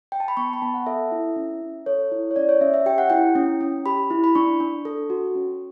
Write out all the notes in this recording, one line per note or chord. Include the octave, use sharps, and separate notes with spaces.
G5
A5
B5
B3 C#6
B5
B3 A5
F#5
A4 E5
E4
C#4
C#4
A4 C#5
E4
C#5
C#4 D5
C#5
C#4 E5
E5
G4 G5
F#5
E4 G5
C#4
C#4
G4 B5
E4
B5
D4 C#6
D4
A4
F#4
C#4